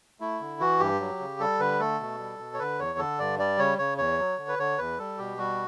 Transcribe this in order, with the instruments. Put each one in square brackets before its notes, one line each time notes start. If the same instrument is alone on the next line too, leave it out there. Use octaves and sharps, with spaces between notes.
[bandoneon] A3 E4
D3
E3 F#4
G2 G4
F#3
C#3
G3 A4
D3 B4
A3 A4
B2
G3
B2
C#5
D3 B4
E2 C#5
D3 A4
G2 D5
G3 D5
C#3 C#5
C#3 C#5
E2 C#5
F#3
D3
B4
D3 C#5
E2 B4
G3 A4
B2 G4
G3 F#4